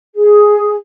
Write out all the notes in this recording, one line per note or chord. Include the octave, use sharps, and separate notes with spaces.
G#4